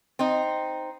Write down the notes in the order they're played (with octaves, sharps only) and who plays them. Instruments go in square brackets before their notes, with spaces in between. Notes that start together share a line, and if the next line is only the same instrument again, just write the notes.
[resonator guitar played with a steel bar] C4 D#4